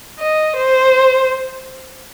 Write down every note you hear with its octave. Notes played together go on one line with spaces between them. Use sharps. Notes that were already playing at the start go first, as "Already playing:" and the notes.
D#5
C5